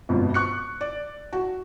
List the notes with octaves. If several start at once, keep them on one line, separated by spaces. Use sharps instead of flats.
G1 F2 G#2 B2
C#6 F#6 C#7
D5
F#4